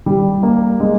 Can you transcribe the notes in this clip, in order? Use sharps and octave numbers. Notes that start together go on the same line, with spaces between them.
G3
A#3
G#3